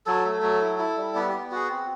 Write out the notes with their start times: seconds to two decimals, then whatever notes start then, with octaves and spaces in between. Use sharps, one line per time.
0.06 F#3 A4
0.25 A3
0.42 F#3
0.61 E4
0.79 E4
0.97 G3
1.15 B3 G4
1.29 B3 G4
1.51 F#4 G#4
1.69 C4